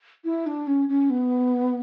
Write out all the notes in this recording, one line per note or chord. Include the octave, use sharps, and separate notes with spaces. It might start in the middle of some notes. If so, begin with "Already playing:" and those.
E4
D4
C#4
C#4
B3